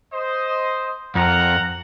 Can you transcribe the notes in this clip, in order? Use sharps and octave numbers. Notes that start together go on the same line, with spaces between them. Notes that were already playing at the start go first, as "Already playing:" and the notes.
C5 D#5
F2 A#4 F#5 A#5